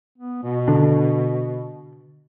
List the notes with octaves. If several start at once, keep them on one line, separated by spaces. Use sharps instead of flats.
B3
B2
D3 D4